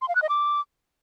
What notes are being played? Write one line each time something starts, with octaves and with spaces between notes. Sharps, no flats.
C6
F5
F#6
D#5
D6